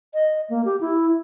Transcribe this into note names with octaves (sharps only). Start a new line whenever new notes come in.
D#5
A#3
G4
E4